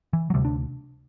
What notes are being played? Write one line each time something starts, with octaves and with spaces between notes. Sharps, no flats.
E3
F#3
D2 C3 G3
D4